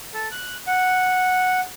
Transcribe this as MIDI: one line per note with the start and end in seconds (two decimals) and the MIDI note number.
0.14 0.28 69
0.32 0.56 90
0.67 1.60 78